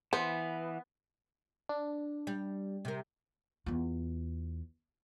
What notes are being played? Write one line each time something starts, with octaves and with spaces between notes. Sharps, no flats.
E3 B3 C5
D4
G3
C3 A#4
E2 F4